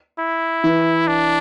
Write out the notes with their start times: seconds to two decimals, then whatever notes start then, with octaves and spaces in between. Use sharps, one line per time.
0.19 E4
0.64 E3
1.07 D4